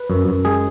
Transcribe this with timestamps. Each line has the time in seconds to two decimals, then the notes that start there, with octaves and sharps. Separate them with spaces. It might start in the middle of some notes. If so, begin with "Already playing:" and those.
Already playing: B4
0.10 F#2
0.28 F#2
0.45 G#3 G#4